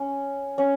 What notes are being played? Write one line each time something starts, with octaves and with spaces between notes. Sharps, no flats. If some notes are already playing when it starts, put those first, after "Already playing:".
Already playing: C#4
C#4